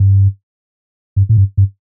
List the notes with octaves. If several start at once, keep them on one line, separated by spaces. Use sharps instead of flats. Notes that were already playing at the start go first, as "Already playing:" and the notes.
Already playing: G2
G2
A2
G2
G2